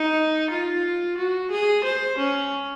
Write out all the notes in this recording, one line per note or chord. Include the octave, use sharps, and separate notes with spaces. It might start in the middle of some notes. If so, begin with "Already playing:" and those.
Already playing: D#4
F4
F#4
G#4
C5
C#4